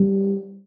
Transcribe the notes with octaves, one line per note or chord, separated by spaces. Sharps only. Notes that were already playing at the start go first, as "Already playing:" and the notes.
Already playing: G3